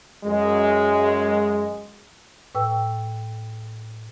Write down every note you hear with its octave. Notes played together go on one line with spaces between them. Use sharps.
F#2 G#3
A2 B4 G5 E6